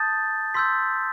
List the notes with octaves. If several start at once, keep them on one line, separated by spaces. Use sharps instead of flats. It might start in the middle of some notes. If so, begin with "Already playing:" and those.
Already playing: A5 D#6 G6 A6
C6 E6 G6 B6